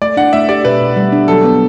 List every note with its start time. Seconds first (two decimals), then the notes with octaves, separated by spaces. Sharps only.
0.02 A3 D5
0.17 D4 F#5
0.33 A3 E5
0.49 G4 D5
0.65 B2 B4
0.81 B2
0.97 G3
1.12 D4
1.28 F#3 A4
1.44 B3